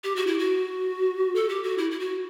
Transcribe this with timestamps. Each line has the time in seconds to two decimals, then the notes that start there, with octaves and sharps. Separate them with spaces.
0.04 G4
0.16 F#4
0.27 E4
0.39 F#4
1.35 A4
1.49 G4
1.63 F#4
1.78 E4
1.91 E4
2.00 F#4